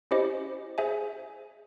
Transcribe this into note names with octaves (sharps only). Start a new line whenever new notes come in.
C#4 E4 G4 C5 D#5
G#4 C5 E5 G#5